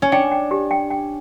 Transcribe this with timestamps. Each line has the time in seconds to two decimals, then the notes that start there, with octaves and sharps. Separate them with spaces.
0.02 C#4
0.12 D4 G5
0.31 G5
0.51 G4
0.71 G5
0.90 G5